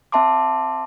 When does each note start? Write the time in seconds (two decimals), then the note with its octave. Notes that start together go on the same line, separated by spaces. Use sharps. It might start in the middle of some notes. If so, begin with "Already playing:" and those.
0.12 C4 E5 A5 C6 D6